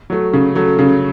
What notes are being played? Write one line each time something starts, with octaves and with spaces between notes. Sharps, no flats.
F#3 A3
C#3
F#3 A3
C#3